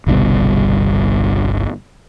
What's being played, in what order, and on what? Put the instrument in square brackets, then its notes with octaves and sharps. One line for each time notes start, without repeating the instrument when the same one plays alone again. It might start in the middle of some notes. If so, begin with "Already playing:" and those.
[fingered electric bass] G1 C2 G2 B2